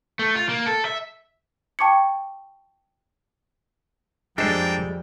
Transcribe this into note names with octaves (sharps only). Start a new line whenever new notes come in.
A3
F4
A#3
A4
E5
G5 A5 C#6 D6 G#6 C#7
F2 G3 G#3 A#3 D4 A4 C5 G5